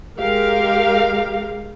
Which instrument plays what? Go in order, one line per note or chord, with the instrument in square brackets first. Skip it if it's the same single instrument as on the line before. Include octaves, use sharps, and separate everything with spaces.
[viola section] G#3 G4 A#4 F5